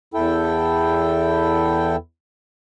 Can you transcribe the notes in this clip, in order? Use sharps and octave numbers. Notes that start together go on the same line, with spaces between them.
E2 E4 A4 G5